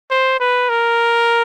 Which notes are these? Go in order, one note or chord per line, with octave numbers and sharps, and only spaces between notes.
C5
B4
A#4